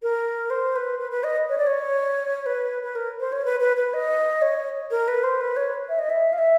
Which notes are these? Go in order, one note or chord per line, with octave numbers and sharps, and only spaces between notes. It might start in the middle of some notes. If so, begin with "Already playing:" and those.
A#4
C5
B4
B4
B4
D#5
C#5
D5
C#5
B4
B4
A#4
C5
C#5
B4
B4
B4
D#5
C#5
A#4
B4
C5
B4
C#5
E5
D#5
E5
F5
E5